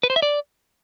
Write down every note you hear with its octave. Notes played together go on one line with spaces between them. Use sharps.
B4
C5
E5
D5